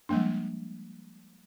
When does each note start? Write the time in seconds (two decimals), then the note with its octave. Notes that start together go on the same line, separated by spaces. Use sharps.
0.09 F3 G3 G#3 A#3 D4